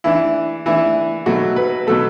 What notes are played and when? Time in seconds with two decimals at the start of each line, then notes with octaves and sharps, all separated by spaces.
0.04 E3 D4 E4
0.66 E3 D4 E4
1.26 B2 F#3 A3 F#4
1.56 B4
1.87 B2 F#3 A3 A4